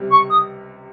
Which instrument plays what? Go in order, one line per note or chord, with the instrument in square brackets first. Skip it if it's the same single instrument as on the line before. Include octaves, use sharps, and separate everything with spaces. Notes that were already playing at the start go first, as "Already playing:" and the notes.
Already playing: [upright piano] C#2 C3 G3
[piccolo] C#6
D#6